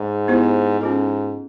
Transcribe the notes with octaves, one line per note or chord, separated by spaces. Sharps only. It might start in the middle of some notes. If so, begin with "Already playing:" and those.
Already playing: G#2
B3 E4 G4 C5
G#2 C#4 F4 A4